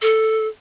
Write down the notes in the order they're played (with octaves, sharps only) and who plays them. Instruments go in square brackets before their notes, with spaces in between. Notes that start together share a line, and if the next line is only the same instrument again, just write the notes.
[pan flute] A4